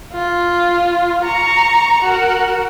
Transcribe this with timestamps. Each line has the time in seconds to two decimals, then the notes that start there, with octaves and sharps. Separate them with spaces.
0.13 F4
1.25 A#5 C#6
2.04 F#4 A#4